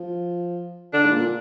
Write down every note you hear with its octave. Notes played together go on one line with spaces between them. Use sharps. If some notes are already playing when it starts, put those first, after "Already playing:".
Already playing: F3
D3 D4
G#2
A#2